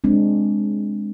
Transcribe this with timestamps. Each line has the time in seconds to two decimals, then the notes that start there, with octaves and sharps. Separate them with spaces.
0.04 G#3 C4 D4